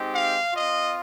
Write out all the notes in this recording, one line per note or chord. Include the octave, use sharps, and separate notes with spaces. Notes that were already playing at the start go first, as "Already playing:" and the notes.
Already playing: G#3 C4 D#4 G4
F5
C4 F4 D#5